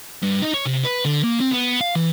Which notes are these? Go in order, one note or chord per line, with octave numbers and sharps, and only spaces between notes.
G2
D#4
C#5
C3
B4
D3
A#3
C4
B3
F5
E3